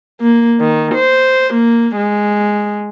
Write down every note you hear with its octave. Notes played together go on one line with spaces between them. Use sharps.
A#3
D#3
C5
A#3
G#3